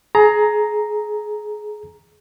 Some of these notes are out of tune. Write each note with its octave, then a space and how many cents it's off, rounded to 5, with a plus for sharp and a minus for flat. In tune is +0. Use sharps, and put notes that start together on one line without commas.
G#4 +25 A#5 +0